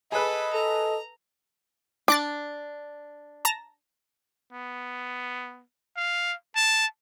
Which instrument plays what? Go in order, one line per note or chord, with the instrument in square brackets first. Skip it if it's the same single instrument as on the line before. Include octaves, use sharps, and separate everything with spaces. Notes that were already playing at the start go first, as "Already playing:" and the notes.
[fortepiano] G#4 B4 [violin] A4 B5 [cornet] D#5
[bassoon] A4 [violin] A#5
[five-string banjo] D4 [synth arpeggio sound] D6 F#6 A6
[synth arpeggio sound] A5 A#5 A#6
[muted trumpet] B3
F5
A5